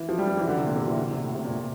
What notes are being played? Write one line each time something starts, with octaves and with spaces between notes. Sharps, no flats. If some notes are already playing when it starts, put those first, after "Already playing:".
Already playing: E3
F3
G3
F3
E3
D3
C3
A#2
C3
E3
D3
C3
A2
C3
A#2